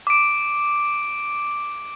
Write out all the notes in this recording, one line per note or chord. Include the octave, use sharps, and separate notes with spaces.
D6 D7